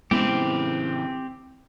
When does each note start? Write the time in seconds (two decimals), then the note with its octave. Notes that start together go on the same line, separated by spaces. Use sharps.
0.11 C#3 E3 G#3 B3 C4 G4